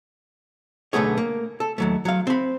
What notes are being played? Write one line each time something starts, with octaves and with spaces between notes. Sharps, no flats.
B1 D3 A3 B3 G#4 C#5
A#3
A4
D#2 F#3 A3
F#3 F5
C4 B5